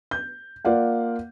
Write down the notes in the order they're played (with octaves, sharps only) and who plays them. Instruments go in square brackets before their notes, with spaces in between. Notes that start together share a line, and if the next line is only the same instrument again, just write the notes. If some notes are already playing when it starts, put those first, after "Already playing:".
[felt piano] G6
A#3 F4 D5 F5 F#5